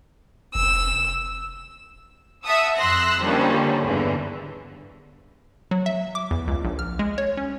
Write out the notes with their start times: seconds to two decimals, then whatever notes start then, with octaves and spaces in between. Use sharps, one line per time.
0.55 F1 E6
2.44 E5 F#5 A5 D#6 E6
2.77 F2 C6 E6 F#6 A#6
3.21 D3 D#3 F3 G3 A#3 C#4
3.83 E2 G2 D3 E3
5.71 F#3
5.86 E5
6.15 D6
6.31 E2
6.48 C#2
6.64 A#1
6.79 F6
6.99 G#3
7.18 C#5
7.37 C#4